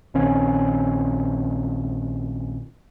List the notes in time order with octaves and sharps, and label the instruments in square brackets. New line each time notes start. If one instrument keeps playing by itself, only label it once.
[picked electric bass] A#1 D#3 C4 C#4